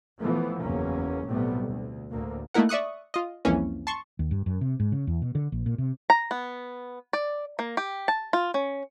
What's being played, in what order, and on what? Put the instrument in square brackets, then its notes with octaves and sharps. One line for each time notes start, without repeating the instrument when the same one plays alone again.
[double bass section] E3 F3 A3 B3
F#1 E2 A#3 C#4
B1 A2 C3 G3 A3 B3
D2
D2 A2 A#3
[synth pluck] A3 A#3 D#4 E4 A#4 F#5
D5 E5 C#6 D#6 F#6
F4 D#5
C2 F2 E3 A#3 C#4
A5 C6 C#6
[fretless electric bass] D#2
G2
F#2
C3
G#2
C#3
E2
B2
D3
A#1
A#2
C3
[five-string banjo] A#5
B3
D5
A#3
G4
A5
F4
C#4